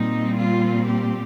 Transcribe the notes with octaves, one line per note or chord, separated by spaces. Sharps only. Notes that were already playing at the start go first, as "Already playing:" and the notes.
Already playing: A#2 G3 C4 D#4
F4
G4